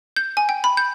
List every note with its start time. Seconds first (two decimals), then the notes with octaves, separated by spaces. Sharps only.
0.17 G6
0.37 G#5
0.49 G5
0.64 B5
0.77 G6